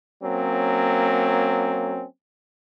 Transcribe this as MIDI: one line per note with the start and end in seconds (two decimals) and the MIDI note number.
0.22 2.03 54
0.22 2.03 58
0.22 2.03 60
0.22 2.03 61